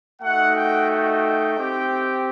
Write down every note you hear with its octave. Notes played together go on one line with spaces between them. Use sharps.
A3 D#4 F#4 F#5
G5
G5
C4 G4